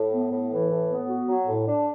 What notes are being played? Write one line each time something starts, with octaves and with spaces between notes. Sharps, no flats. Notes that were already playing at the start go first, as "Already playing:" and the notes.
Already playing: A2
B3
A2
E3
A2
B3
F#4
F#3
A2
D4